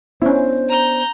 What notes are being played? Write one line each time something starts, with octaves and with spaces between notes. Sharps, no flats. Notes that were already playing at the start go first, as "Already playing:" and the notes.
B3 C#4 D4 E4 C5
A#5 G6